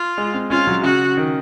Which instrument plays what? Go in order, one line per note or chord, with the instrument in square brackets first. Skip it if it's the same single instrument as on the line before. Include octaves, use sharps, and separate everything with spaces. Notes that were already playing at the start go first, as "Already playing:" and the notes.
Already playing: [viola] F4
[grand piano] G#3
C4
[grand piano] C#4 [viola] F4
[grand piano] F#3
[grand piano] C#3 [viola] F#4
[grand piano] D#3